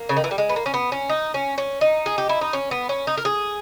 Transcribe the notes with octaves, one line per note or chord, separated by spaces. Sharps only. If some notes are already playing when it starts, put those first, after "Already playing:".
Already playing: A#3
C#3
D#3
E3
G3
G#3
B3
A#3
C#4
B3
C#4
D#4
C#4
C#4
D#4
G#4
G4
E4
D#4
C#4
B3
C#4
D#4
A#4
G#4